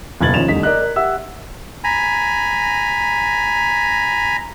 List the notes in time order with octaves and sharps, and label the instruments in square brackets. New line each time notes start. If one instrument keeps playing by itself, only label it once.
[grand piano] F#1 B2 A#3 G#6 A6 F#7
D#3 F3 C#4 F4 E7 F7
F1 C2 D3 D#4 B6
A#4 D5 D#5 F#6
A#4
G4 E5 F#5 E6
[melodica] G#5 A#5 B5